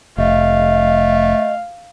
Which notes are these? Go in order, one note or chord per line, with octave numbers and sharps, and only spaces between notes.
F1 A3 D#5 F5